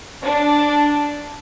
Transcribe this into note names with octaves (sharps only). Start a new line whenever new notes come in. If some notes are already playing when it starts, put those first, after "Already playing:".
D4